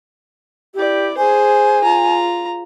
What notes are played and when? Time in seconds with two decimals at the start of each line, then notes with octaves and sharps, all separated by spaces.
0.74 E4 G4 D5
1.18 G#4 C5 G#5
1.84 F4 A#5